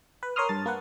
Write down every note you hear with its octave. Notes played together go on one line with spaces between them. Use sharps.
B4
A#4 C#5 A#5 C6 D#6 F6
G2 A5 A6
A#3 B4 F#5